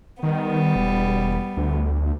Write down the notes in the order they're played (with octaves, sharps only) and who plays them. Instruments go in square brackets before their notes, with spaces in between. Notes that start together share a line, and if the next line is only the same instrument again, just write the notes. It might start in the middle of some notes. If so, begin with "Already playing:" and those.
[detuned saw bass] D#3 [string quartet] G3 B3
[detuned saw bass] E1
D2